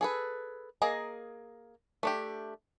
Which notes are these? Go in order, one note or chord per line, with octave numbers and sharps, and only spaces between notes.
G#4 A4 B4
A#3 G#4 D#5 A#5
A3 D4 G4